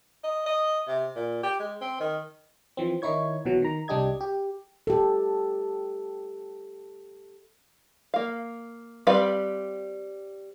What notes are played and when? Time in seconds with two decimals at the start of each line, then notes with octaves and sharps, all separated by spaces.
0.24 D#5
0.46 D#5
0.88 C3
1.15 A#2
1.43 G4
1.60 G#3
1.81 C4
2.00 D#3
2.77 E3 F3 C4
3.02 D#3 D#4 E4 C#5 G#6
3.45 B1 B2 E3 F#3
3.62 D#3 A#5
3.88 C2 G3 D4 G4 D#5 G#6
4.21 G4
4.87 G4 A4
8.14 A#3 F5
9.07 G3 C4 B4 D5 F5